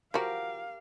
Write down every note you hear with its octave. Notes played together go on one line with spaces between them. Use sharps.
F3 F#4 G4 A#4 F5